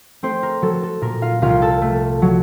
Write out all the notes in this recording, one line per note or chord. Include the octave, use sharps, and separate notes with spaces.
A3 C4 C5
A#4
F#3 A4
A4
A#2 A#4
F4 F5
C2 F4 F5
A4 A5
A3
F#3